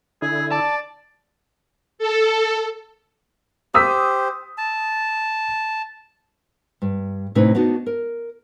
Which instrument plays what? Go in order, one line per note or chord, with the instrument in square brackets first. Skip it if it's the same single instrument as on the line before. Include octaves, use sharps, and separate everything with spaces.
[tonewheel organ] D3 E4 [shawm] G#4
[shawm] D5 [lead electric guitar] A5
[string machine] A4
[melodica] G4 C5 [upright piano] D#6 E6 B6
[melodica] A5
[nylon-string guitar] G2
A2 C3 C#4 D#4 B4 C#5
B3 D4 D#4 F#4
A#4